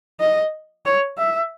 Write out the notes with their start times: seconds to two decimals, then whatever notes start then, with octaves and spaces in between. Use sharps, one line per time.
0.20 D#5
0.86 C#5
1.18 E5